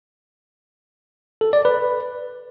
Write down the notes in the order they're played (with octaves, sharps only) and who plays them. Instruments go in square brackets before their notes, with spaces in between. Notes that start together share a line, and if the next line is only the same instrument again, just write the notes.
[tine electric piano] A4
D5
B4